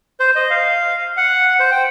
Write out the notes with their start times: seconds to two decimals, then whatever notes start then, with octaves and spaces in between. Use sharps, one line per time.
0.20 C5
0.35 D#5
0.50 F5
1.17 F#5
1.60 C5
1.71 G5